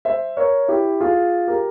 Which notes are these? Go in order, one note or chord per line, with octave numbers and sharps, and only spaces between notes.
C5 E5
A#4 C#5
E4 G4
F4 G#4
G4 A#4